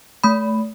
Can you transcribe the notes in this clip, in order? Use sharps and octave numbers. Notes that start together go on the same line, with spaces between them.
A3 B5